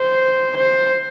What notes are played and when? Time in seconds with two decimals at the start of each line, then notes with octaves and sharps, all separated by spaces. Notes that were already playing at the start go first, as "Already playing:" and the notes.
Already playing: C5
0.56 C5